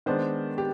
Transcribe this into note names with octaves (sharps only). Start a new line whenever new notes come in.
D#3 G#3 B3 D4 C5
G4